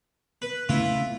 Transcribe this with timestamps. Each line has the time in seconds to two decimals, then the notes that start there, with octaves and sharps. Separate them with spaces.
0.42 B4
0.69 C#3 A3 B3 E4 F4